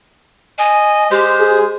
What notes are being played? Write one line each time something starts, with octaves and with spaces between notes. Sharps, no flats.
D#5 G#5
G#3 G4 C5
G#4